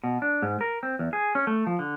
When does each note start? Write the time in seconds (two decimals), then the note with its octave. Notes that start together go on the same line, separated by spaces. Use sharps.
0.04 B2
0.22 D4
0.42 G#2
0.61 A#4
0.83 C4
0.99 E2
1.13 G#4
1.35 C#4
1.47 A3
1.67 F3
1.79 D3